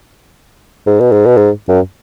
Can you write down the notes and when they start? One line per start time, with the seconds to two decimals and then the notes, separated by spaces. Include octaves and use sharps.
0.86 G#2
1.00 B2
1.12 G#2
1.26 B2
1.37 G#2
1.68 F#2